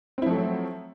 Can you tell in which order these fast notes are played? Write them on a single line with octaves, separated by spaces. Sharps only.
C4 E4 F3 A3 F#3